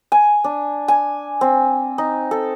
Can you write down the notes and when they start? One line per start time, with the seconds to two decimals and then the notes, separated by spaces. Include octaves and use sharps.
0.12 G#5
0.44 D4
0.88 G#5
1.41 C4
1.98 D#4
2.31 A4